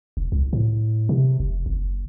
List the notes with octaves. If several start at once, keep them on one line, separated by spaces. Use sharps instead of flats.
E1
C2
A2
C3
F1
F#1